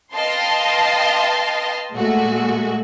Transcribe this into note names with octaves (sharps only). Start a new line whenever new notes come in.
B4 D#5 F5 G5 A5 C6
A#2 G#3 A3 F#4